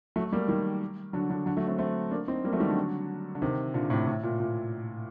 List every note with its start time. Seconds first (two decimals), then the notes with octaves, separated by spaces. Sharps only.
0.16 F#3 A3
0.32 G3 A#3
0.48 D#3 G3
1.13 D3 F#3
1.30 D3 F#3
1.46 D3 F#3
1.57 F#3 A3
1.67 A3 C4
1.79 A3 C4
2.11 A#3 D4
2.28 C4 D#4
2.45 G3 A#3
2.52 F#3 A3
2.60 D#3 G3
2.68 D3 F#3
3.35 D3
3.42 C3 D#3
3.74 A#2 D3
3.90 A2 C3
4.07 A2
4.23 A#2
4.40 A#2